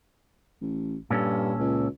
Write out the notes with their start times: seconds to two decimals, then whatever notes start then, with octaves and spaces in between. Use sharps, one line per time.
0.61 A1
1.11 G2 A#2 C#4 A4
1.59 C#2